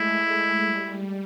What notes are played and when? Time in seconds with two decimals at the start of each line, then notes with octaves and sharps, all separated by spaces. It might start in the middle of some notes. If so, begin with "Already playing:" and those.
Already playing: G#3 A3 E4
0.59 G3